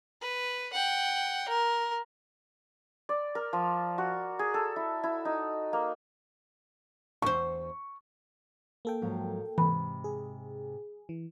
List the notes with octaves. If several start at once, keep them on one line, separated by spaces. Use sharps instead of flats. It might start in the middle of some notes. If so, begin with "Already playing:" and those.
B4
F#5 G5
A#4
D5
A#4
F3
F#4
G#4
A4
E4
E4
D#4
A#3
E2 C5 C#6
A#3 A4 G5
G#2 F3 F#3
G#2 C3 E3 B5
G#4
E3